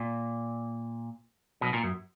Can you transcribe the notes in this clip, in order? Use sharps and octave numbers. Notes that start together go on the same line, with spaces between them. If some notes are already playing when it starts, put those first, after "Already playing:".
Already playing: A#2
B1 B2
A#2
F#2